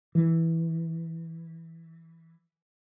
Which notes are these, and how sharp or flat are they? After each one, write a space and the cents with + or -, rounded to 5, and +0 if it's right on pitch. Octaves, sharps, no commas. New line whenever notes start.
E3 -5